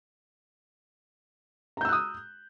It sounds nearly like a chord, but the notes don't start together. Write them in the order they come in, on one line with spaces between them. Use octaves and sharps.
A#5 G6 E6 F#6 D#6